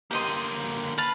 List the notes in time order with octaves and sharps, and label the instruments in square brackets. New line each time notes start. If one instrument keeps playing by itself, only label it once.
[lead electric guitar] D3 A#3 [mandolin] G4 D#5 C6
[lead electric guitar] B4 [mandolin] F5 A5